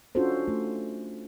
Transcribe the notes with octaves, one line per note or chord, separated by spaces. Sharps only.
C#4 D4 F4 F#4 A4 C5
A3